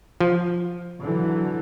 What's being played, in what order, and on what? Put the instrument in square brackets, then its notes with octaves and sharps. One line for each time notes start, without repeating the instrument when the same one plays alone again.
[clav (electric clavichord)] F3
[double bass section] D3 E3 F#3